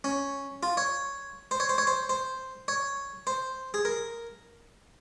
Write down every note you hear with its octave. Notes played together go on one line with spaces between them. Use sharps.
C#4
F4
C#5
C5
C#5
C5
C#5
C5
C5
C#5
C5
G#4
A#4